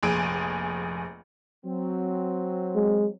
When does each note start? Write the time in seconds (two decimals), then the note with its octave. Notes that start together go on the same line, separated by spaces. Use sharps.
0.03 F1 A#1 G#4 D7
1.65 F#3 C4
2.75 G#3